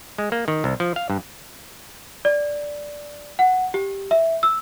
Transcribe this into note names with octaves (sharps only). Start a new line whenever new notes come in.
G#3
A#3
D#3
C2
F3
F5
G2
D5
F#5
G4
E5
E6